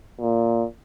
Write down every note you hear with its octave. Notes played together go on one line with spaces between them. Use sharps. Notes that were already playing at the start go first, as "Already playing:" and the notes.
A#2